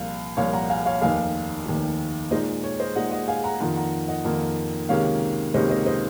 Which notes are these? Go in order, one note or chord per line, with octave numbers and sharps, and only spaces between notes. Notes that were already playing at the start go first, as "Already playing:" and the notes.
Already playing: C2 A#2 F3 F5
C2 A#2 F3 C#5 F5
F#5 A#5
F5 G#5
C#5 F5
F1 D#2 D#3 F5 G#5
F1 D#2 D#3
A#2 G#3 D#4 C5 D#5
C#5
C5 D#5
A#2 G#3 D#4 D#5 F#5
D#5 F#5
F5 G#5
F#5 A#5
F2 D#3 A#3 F4 F#5 A#5
F#5 A#5
D#5 F#5
F2 D#3 A#3 F4
C#2 C3 D#3 A#3 C#4 C#5 F5
C#2 C3 D#3 A#3 C#4 C5 D#5
C5 D#5
C5 D#5